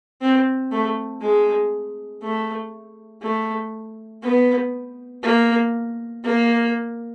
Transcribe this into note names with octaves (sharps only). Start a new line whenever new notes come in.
C4
A3
G#3
A3
A3
B3
A#3
A#3